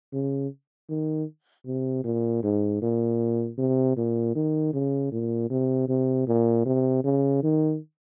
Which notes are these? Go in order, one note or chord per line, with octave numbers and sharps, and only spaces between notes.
C#3
D#3
C3
A#2
G#2
A#2
C3
A#2
D#3
C#3
A#2
C3
C3
A#2
C3
C#3
D#3